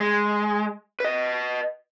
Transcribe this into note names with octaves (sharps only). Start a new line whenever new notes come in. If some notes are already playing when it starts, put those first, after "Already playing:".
G#3
B4 D#5